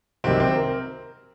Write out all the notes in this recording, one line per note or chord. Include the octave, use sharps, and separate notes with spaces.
C2 C3 D#3 F#3 C4
C4
A#4